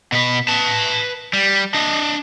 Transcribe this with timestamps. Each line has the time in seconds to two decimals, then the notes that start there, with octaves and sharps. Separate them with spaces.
0.12 B2 B4
0.48 B4 A5
1.33 G3
1.74 D4 D#5